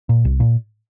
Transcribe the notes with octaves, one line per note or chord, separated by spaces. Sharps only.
A#2
C2
A#2